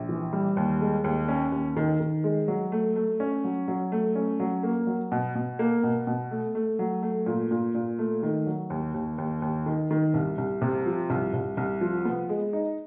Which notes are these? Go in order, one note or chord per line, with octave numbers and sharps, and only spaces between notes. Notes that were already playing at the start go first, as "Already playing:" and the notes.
Already playing: A#1
E3
G3
D#2
G#3
D#2
C#4
D#2
D#3
D#3
G#3
F#3
A3
A3
C#4
F#3
F#3
A3
C#4
F#3
A#3
F#3
B2
B2
A#3
B2
B2
A3
A3
F#3
A3
A#2
A#2
A#2
A3
D#3
F#3
D#2
D#2
D#2
D#2
D#3
D#3
C2
C2
C3
F3
C2
C2
C2
F3
B3
G#3
D#4